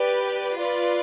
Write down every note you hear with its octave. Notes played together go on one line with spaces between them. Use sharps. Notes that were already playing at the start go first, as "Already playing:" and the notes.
Already playing: G4 B4 D5
F4 B4 D5